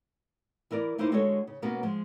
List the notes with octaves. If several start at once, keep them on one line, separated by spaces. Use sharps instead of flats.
E3 E4 A#4 D5
A#3 D#4 E4 A#4 C5
D3 G#3 F#4 A4 C5 C#5
C#3
B2 A#3 B3 C#4 F#4
F3 G#3